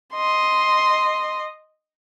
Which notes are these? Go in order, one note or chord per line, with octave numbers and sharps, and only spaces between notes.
D#5 C6